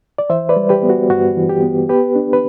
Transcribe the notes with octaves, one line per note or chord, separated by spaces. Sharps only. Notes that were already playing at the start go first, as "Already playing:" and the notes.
D5
E3 C5 E5
B4 D5
G3
G4 B4
B3
F#4
G2 F#4
E3
G4
B3
B3 G4 B4
D4
B4